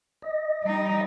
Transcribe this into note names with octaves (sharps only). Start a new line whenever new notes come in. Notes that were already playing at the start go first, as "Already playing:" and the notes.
D#5
G3 D#4